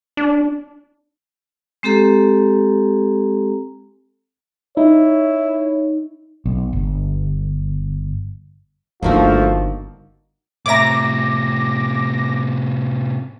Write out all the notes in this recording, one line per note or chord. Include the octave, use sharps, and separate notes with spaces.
D4
G#3 C4 G4 A4 A#5
D#4 E4 C#5
B1
G1
G1 D3 F3 A3 A#3 D#4 F4 F#4
A2 C3 C#5 E5 A#5 D6 A#6